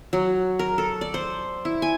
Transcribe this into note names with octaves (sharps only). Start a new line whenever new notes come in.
F#3
A#4
A4
D5
C5
E4
G#5